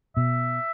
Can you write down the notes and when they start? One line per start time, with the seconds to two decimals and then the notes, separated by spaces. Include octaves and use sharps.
0.16 B2 E5